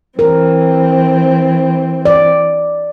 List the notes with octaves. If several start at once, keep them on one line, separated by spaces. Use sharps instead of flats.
E3 C4 A#4
D5